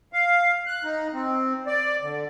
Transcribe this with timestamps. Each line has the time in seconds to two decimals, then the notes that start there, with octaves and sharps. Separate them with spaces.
0.13 F5
0.67 F#6
0.84 D#4
1.13 C4
1.67 D5
2.02 D3